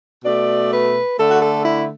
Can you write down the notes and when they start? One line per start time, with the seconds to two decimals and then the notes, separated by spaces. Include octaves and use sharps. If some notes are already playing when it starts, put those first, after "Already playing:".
0.24 B2 A3 D5
0.71 B4
1.17 D3 A3 A4
1.29 F#4
1.41 A4
1.64 E4